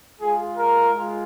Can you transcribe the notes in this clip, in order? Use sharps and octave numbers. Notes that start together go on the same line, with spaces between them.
G#3 F4 G#4
A#4
G#3 F4